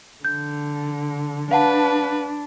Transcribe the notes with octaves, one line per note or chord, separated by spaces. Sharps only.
D3 G6
D4 B4 F5 F#5 A5